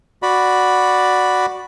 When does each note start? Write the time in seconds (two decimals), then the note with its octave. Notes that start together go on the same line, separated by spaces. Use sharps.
0.23 F#4 D5 B5